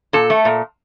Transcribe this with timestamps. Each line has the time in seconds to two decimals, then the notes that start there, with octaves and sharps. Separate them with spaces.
0.13 A#2 A4
0.30 A3
0.45 A#2